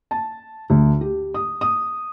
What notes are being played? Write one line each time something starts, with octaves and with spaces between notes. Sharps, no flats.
A5
D2
G4
D#6
D#6